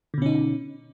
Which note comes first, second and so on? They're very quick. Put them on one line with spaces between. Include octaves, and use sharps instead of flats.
D3 B2 C#4 D#4